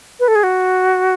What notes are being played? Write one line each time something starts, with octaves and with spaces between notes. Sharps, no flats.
B4
A4
G#4
F#4